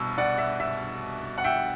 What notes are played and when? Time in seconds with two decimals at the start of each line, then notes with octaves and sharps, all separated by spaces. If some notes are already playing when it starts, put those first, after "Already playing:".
Already playing: C2 B2 E6
0.18 D5 F#5
0.38 E5
0.60 E5
1.38 F#5
1.44 E5 G5